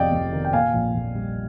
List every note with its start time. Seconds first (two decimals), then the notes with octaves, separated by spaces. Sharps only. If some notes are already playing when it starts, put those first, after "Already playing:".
Already playing: F1 F2 C3 D#3 D5 D#5 F5 G5
0.12 F2
0.33 D#3
0.45 G5
0.53 A#2 F5 G#5
0.74 A#1
0.95 A#1
1.15 G3